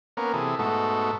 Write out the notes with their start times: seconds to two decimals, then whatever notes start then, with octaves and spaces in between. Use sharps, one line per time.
0.17 A#3 B3 C#4 A#4
0.33 C3 E3 G#4 A4
0.59 G#2 B2 A3 F#4 A4